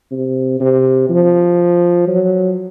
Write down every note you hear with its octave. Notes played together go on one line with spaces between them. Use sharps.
C3
C3
F3
F#3